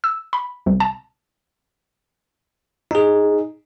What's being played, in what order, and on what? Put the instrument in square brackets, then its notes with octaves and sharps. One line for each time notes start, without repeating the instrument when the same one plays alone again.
[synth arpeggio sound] E6
B5
C2
A5
[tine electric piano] D#4 G#4